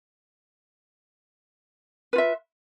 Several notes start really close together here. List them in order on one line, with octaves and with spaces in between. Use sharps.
B4 F4 E5